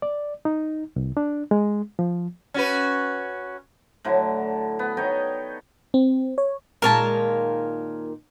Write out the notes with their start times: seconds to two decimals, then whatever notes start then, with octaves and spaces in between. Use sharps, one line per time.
0.02 D5
0.45 D#4
0.96 C2
1.17 D4
1.51 G#3
1.99 F3
2.54 C#4 F#4 B4
4.05 A2 D3 F#3
4.79 B3
4.97 D#4 C#5 D#5 G5
5.94 C4
6.38 C#5
6.82 A#2 D#3 G#3 A#4 C#5 A5